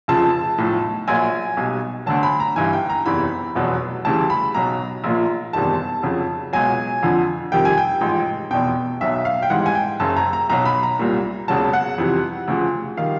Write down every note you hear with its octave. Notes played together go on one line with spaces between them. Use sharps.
F1 F2 C#3 F3 A5
B1 A2 F3
A#1 A#2 F#3 G#5
B1 B2 G3
D2 D3 F#3 A5
B5
A#5
G1 G2 E3 G#5
G5
A#5
F#1 E2 C3 E3 B5
F1 E2 B2 F#3
D2 C#3 E3 G3 A5
B5
B1 B2 F#3 A#5
A#1 A#2 F3
F#1 E2 C3 D#3 G3 A5
F2 C#3 F#3
C#2 B2 F#3 G#5
F2 D3 F3
F2 C3 D#3 G3 G5
G#5
G5
A1 G#2 F3
F1 E2 B2 G5
B1 B2 F#3 E5
F5
G5
G#1 G#2 E3 G3 F#5
G#5
G5
F#1 F#2 C#3 A5
A#5
A#5
B1 B2 F#3 A#5
B5
A#5
C2 A#2 G3
E1 E2 C#3 F#3 A5
F#5
F2 C3 E3 G3
D2 C#3 F3
D#3 G3 F5